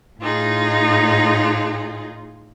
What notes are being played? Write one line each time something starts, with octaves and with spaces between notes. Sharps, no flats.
A2 D#4 F4 G#4